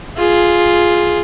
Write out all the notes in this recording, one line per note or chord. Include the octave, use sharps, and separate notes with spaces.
F4 G#4